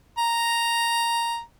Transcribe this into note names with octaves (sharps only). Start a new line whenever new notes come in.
A#5